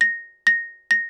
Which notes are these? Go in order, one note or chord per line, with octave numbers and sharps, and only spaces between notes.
A#6
A#6
A#6